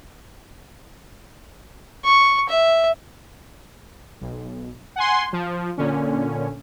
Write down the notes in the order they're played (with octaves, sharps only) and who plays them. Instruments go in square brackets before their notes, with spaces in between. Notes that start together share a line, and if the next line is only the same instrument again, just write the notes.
[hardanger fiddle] C#6
E5
[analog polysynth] B1
F#5 G#5 C6
F3
A#2 D3 C#4